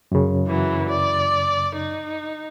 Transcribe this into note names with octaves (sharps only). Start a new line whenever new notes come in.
F#2 C#3
E3 F#3
D5
D#4